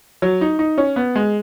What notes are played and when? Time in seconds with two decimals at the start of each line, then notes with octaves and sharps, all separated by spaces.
0.22 F#3
0.41 D#4
0.59 D#4
0.78 C#4
0.96 B3
1.15 G#3